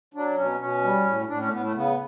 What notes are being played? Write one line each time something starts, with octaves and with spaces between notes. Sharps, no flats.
F#3 D4
B2 C#4
B2 C#4
G3
A2
A2 D4
C#4
A3
A2 B3
A3
C#3 B3